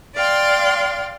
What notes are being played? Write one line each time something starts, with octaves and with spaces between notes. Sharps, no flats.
D5 F5 G5 C6